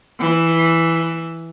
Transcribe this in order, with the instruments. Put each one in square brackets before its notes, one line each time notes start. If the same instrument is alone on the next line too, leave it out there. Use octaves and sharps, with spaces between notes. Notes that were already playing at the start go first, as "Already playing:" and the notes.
[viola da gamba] E3